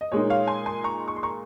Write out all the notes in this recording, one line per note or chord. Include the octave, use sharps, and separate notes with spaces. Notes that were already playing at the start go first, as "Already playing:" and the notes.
D#5
A#2 G#3 D#4 C#5
C#5 F5
G#5 C6
G#5 C6
A#5 C#6
C#6
C6
A#5 C#6